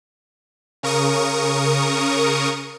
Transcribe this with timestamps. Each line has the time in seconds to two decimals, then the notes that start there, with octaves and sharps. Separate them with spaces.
0.83 C#3 A#4 C#6 D#6